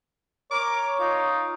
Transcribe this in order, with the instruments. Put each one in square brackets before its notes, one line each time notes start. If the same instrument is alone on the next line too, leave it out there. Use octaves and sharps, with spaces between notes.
[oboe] A#4 [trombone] C#5 [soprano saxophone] D6
[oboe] D#4 [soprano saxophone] F4